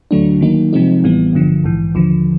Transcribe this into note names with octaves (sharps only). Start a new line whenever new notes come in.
D2 D3 F#3 A3 D4
D#3 F#3 A#3 D#4
C3 F3 G#3 C4 D#4
A1 A2 E3 G3 B3
G#1 G2 D3 F3
A#1 G#2 E3
D#2 D3 F3